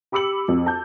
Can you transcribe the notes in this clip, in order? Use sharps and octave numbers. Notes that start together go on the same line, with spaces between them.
G4 B5 D6 E6 C#7 F#7
F2
A5 G6